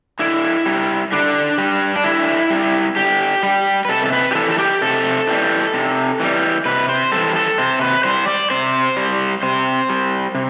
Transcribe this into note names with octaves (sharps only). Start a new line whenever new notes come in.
D3 E4
G3
D3 D4
G3
D4
D3 E4
G3
D3 G4
G3
B4
C3 A4
A4
B4
G4
E3 G3 A4
A4
G4
C3 A4
E3 G3
C3
E3 G3
C3 B4
C5
E3 G3 A4
A4
C3 C5
B4
G3 C5
D5
C3 C5
G3
C3 C5
G3
C3